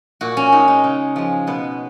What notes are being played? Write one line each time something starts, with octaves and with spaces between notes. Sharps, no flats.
A#2 F#4
C#4
G#3 D#4
D#4
C#3
F3 G#3
B2 B3